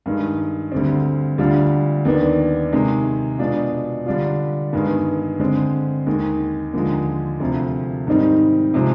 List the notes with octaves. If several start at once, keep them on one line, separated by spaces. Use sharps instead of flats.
G2 D#3 G#3
D2 D3 G3 C4
D2 D3 G3 D4 F4
D#2 D#3 B3 D4
C3 D#3 G#3
B2 G#3 D4 F4
D3 G3 D4 F4
G2 D#3 G#3 B3
D3 G#3 C4
D#2 D#3 G#3
D#2 D3 F3 G#3
D2 C3 F3 C4 F4
G#2 D#3 G3 C4 D#4
C3 F3 G#3 C4